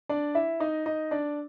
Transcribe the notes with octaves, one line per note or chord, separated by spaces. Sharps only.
D4 D5
E4 E5
D#4 D#5
D#4 D#5
D4 D5